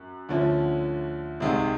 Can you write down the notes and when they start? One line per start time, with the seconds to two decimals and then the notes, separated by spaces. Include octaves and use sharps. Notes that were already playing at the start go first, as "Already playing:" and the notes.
Already playing: F#2
0.29 D2 D3 F3 A3 C#4
1.40 C2 C3 D#3 G#3